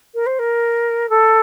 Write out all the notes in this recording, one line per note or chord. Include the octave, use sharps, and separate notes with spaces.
A#4
C5
A#4
A4